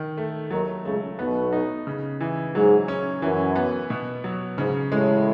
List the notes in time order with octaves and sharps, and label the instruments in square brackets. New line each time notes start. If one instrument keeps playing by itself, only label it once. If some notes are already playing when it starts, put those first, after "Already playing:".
Already playing: [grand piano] D#3
A3
[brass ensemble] D#2 D#3 [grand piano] F#3
[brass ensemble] C#2 C#3 [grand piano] A3
[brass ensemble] B1 B2 [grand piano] B3
[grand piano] D#4
C#3
E3
[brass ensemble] G#2 [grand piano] F#3
[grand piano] C#4
[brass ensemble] F#2 [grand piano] E3
[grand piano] B3
B2
F#3
[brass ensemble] G#2 [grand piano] C#3
[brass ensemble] A1 A2 [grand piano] G#3